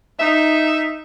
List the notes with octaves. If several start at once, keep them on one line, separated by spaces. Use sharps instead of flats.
D#4 E5